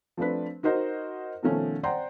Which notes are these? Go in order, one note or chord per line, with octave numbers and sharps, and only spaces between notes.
F3 A3 C4 D4 B4
D#4 F#4 A#4 C5 D#5
B2 D#3 F3 A3 C#4
C5 D5 F#5 G5 A#5 C6